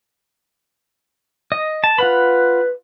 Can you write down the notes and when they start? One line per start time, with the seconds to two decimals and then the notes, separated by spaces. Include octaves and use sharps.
1.52 D#5
1.84 A5
1.98 F4 B4 F#5 B5